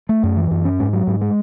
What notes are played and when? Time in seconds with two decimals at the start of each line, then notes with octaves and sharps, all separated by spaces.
0.09 A3
0.23 F#2
0.37 E3
0.51 F#2
0.65 C#4
0.80 G#2
0.93 F#3
1.07 G#2
1.21 G#3